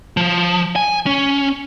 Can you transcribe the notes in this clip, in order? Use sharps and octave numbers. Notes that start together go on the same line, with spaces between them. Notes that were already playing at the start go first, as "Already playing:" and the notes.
F3
G#5
C#4